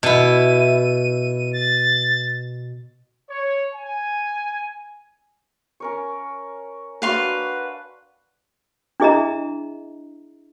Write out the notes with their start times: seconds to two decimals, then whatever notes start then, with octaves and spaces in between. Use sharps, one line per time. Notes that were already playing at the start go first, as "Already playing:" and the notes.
0.03 B2 E4 D#7
1.52 A6
3.30 C#5
3.74 G#5
5.80 C#4 A#4 C#5
7.02 D4 F#4 B4 D5 F5 C6
9.00 D4 E4 G#4 D#5 E5 A#5